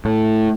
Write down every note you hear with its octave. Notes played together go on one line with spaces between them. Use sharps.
A2